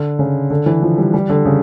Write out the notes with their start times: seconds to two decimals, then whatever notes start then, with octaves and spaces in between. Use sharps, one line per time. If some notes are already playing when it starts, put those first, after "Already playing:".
Already playing: D3
0.19 C#3
0.50 D3
0.66 E3
0.82 F3
0.98 G3
1.14 G3
1.29 D3
1.45 C#3